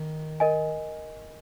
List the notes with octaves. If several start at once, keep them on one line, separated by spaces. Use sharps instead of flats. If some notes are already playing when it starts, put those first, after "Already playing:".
Already playing: D#3
A#4 D#5 G#5